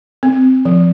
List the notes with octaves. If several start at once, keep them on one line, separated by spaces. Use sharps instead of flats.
C4
F3